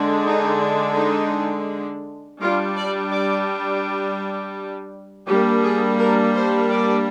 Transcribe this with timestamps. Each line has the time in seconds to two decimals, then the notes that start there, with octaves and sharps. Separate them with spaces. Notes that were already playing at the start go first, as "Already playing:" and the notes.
Already playing: D3 G#3 D4
0.25 D#4
0.97 D#4
2.41 G3 D4 F4
2.77 D5
3.11 D5
5.27 G3 A#3 D4 G4
5.63 G#4
5.99 A#4
6.35 C5
6.70 D5